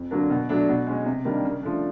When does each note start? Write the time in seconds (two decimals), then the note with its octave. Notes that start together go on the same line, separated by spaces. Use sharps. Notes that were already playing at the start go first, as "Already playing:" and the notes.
Already playing: F2
0.11 D3 F#3 A#3 D4
0.30 B2
0.49 F#3 A3 D4
0.68 B2
0.87 G#3 C#4
1.06 C3
1.25 D#3 G3 A#3 D4
1.44 C#3
1.63 F3 A3 D4